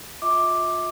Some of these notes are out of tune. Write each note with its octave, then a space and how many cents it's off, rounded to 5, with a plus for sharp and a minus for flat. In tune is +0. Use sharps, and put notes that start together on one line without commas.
F4 +30 E5 -40 D6 +5